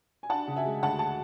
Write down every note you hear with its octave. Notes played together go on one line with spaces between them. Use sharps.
G#5
D4 F#5 A5
C#3
E5 G#5
G#3
D2 F#5 A5
A5